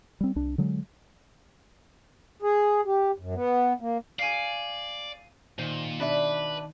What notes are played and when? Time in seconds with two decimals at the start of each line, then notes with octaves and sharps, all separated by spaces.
0.21 G3 C4
0.36 C2 D4
0.58 D3 F#3 G#3
2.42 G#4
2.86 G4
3.18 F#2
3.35 B3
3.80 A#3
4.19 D5 F5 G#5
5.59 A#2 D#3 C5 G#5
6.00 B2 D4 B4 E5